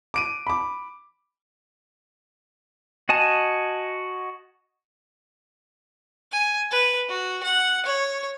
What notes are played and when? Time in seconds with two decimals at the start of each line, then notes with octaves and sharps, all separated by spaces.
0.14 D6 D7 D#7
0.47 B5 D6
3.09 F#4 D#5 G#5 A5
6.32 G#5
6.71 B4
7.09 F#4
7.43 F#5
7.86 C#5